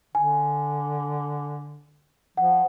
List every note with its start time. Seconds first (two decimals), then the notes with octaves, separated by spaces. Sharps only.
0.15 D3 G#5
2.37 F3 F#5